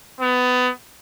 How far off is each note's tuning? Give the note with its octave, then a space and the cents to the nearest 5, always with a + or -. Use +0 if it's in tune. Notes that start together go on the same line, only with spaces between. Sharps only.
B3 +20